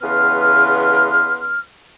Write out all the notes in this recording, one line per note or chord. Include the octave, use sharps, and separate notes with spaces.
E2 C#3 B3 B4 C6 F6